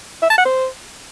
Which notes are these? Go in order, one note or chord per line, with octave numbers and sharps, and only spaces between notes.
E5
A5
F#5
C5